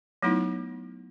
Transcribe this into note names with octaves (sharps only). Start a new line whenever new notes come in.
F#3 A3 B3 D#4 E4